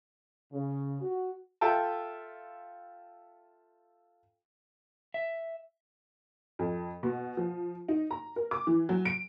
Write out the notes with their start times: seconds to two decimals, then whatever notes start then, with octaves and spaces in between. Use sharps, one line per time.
0.52 C#3
1.01 F#4
1.61 F4 A4 E5 G5 A5
5.14 E5
6.59 F2
7.03 B2
7.37 F3
7.88 D#4
8.11 A#5
8.36 A#4
8.51 D6
8.67 E3
8.89 F#3
9.05 D7